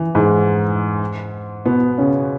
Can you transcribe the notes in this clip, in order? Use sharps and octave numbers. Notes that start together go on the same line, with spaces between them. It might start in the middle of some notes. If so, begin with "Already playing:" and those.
Already playing: E3
G#2 G#3
B2 B3
C#3 C#4